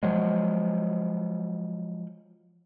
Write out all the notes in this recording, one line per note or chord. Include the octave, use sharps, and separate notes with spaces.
F3 F#3 G#3